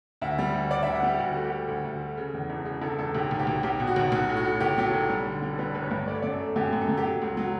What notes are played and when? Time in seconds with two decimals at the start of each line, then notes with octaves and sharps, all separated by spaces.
0.21 D2 E5
0.38 G3
0.54 D2
0.71 D2 D5
0.83 D2 E5
0.95 F#5
1.03 G3 G4
1.19 D2 F#4
1.33 A3 F#4
1.44 G4
1.51 A3
1.68 D2
1.84 D2
2.01 A3
2.17 C#3
2.34 E2
2.50 E1
2.65 C#3
2.82 E1 A4
2.99 E1 A4
3.15 B1 G4
3.31 B1
3.39 G4
3.47 B1
3.63 B1 G4
3.80 B2
3.87 F#4
3.96 B1
4.12 B1 F#4
4.29 A2
4.37 F#4
4.44 A2
4.60 B1 G4
4.78 F#3 G4
4.86 A4
4.94 B1
5.09 G3
5.26 D3
5.42 G3
5.49 A4
5.58 G3 B4
5.75 G1 B4
5.83 C#5
5.91 G2
6.07 A3 D5
6.14 C#5
6.22 F#2 D5
6.32 A4
6.39 A3
6.56 F#2 G4
6.73 F#2
6.81 A4
6.89 F#2
6.97 G4
7.05 F#3 A4
7.22 C#2
7.37 F#3